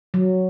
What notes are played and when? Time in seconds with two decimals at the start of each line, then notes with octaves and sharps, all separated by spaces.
0.14 F#3